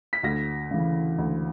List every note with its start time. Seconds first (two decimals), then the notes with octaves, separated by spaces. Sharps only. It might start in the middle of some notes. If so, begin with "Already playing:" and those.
0.13 B6
0.23 D2 A#6
0.71 C#3 E3
1.18 D2